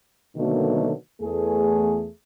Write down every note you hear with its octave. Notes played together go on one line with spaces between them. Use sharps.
B2 D3 D#3 F#3 A3 A#3
E2 A3 G#4